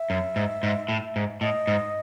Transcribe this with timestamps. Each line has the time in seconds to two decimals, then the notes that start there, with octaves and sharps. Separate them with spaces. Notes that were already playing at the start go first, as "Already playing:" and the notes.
Already playing: E5
0.10 F#2
0.36 G#2
0.63 G#2
0.89 A2
1.16 G#2
1.41 A2 D#5
1.67 G#2